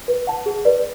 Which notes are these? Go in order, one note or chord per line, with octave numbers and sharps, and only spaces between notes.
B4
F#5 A5
G#4
B4 D5